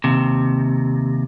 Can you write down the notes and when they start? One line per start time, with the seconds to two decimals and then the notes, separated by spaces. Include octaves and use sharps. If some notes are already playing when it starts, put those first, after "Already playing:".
0.04 D#2 C3